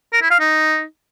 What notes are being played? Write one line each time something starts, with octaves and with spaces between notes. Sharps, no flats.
A#4
E4
F5
D#4